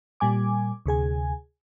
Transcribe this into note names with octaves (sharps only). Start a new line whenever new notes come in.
A#2 G3 G#5 D6
D2 C3 G#4 G#5